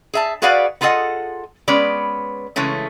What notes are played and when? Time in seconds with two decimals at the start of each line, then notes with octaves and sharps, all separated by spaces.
0.14 G#4 E5 A5
0.42 F#4 G#4 B4 D5 F5 F#5
0.81 B3 F4 G#4 A4 D#5 F#5
1.68 G#3 B3 C#4 B4 D5
2.56 C#3 E3 G#3 A3 C#4